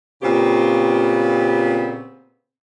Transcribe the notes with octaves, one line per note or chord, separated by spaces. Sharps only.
A#2 C#3 B3 C4 G4